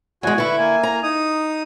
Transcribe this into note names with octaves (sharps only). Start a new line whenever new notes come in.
E2 G#3 F#4 G#5
D3 E4 B4 C#6
A#3 G#5
A#5
D#4 D#6